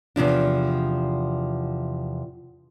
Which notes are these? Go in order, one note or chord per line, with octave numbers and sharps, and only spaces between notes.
E2 C3 F3 D4